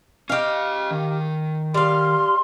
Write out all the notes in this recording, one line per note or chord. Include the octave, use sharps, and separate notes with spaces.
C#4 G4 D#5 F5
D#3
G3 F5 C6